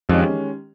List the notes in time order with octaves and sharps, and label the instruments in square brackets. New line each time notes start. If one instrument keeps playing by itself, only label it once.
[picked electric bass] F2 [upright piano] D#3 G#3 C#4 G4